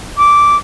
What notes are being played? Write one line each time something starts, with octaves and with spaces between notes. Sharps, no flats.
D6